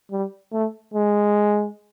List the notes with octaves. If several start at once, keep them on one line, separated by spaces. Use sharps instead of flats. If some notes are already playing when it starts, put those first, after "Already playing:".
G3
A3
G#3